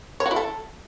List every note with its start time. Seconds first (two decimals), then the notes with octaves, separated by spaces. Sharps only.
0.20 C#5
0.26 F#4
0.31 E4
0.36 A4